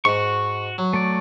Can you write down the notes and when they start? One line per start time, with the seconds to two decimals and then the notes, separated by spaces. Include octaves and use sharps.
0.05 G#2 F#4 C#6
0.78 F#3
0.93 A3 D5